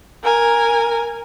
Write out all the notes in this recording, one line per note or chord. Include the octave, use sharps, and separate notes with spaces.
A#4 G#5